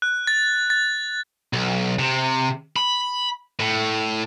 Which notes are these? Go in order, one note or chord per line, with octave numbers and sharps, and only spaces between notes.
F#6
A6
A6
B1
C3
B5
A2